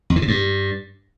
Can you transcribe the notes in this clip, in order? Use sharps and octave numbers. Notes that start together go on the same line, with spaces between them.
F2
E3
C3
G2